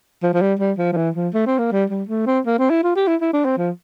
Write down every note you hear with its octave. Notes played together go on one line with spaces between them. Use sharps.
F3
F3
G3
G3
F3
F3
E3
F3
A3
C4
A#3
G3
G3
A3
C4
A#3
C4
E4
F4
G4
E4
E4
D4
C4
F3